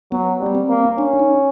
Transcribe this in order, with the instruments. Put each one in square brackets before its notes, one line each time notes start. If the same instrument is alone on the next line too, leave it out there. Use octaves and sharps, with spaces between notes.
[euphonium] F#3 [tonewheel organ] B3
[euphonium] G3
[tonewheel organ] B3
C4
[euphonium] A#3
[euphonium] C#4 [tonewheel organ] D4
[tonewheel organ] D#4